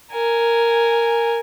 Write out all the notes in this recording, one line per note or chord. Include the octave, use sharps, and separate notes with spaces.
A#4 G#5